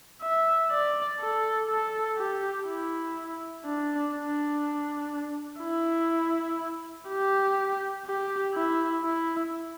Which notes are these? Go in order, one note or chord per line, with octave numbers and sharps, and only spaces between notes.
E5
D5
A4
A4
G4
E4
D4
D4
E4
G4
G4
E4
E4